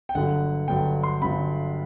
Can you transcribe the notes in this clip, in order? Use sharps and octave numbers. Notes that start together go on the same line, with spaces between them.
G5
G1 G2 D3 F#3 F#5
G1 G2 D3 F#3 G5
C6
G1 G2 D3 F#3 B5